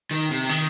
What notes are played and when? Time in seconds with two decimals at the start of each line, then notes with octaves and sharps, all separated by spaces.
0.11 D#3
0.31 C3
0.49 D#3